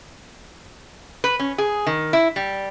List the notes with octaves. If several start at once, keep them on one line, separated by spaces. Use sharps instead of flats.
B4
C#4
G#4
D#3
E4
G3